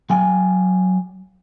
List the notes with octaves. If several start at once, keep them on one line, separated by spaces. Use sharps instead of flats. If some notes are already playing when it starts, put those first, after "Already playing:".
F#3 F5 G5 G#5